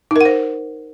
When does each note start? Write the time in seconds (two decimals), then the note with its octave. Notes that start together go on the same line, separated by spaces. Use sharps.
0.11 D#4
0.16 A#4
0.21 F#5
0.25 C5